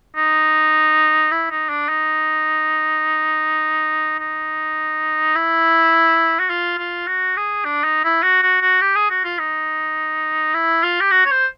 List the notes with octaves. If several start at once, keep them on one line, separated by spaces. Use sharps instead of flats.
D#4
E4
D#4
D4
D#4
D#4
E4
F#4
F4
F4
F#4
G#4
D4
D#4
E4
F#4
F#4
F#4
G4
G#4
F#4
F4
D#4
E4
F4
G4
F#4
C#5
C5